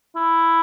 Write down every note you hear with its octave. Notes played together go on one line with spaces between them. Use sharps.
E4